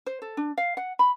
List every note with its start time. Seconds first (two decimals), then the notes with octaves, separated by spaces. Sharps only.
0.06 C5
0.22 A4
0.37 D4
0.58 F5
0.77 F#5
0.99 B5